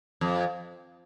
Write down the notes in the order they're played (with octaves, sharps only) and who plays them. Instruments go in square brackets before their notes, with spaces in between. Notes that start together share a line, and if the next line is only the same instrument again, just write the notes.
[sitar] F2